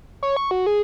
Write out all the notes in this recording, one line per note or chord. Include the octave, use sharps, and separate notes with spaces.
C#5
C#6
F#4
G#4